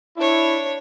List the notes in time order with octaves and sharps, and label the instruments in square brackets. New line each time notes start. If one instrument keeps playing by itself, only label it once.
[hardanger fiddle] D4 C#5 [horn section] E4